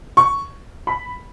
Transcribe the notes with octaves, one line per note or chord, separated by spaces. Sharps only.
C#6
B5